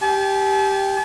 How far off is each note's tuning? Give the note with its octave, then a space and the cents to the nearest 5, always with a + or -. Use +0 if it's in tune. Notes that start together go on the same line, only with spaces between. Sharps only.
G4 +0 A5 -45